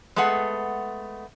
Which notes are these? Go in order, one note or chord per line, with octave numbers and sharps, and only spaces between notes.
G#3 A3 B3 G#4 F#5